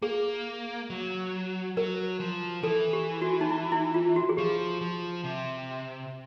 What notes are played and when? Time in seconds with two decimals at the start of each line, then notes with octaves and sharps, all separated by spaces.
0.02 A#3 G#4
0.90 F#3
1.77 F#3 A#4
2.20 F3
2.63 E3 A4
2.93 G4
3.22 F#4
3.41 D#4
3.50 E4
3.72 E4
3.94 F4
4.16 F#4
4.29 G#4
4.37 F3 G4
4.81 F3
5.24 C3